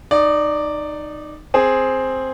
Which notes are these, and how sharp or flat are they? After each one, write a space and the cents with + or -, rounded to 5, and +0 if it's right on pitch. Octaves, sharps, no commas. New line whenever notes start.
D#4 -20 D5 +0
C4 +0 G#4 +0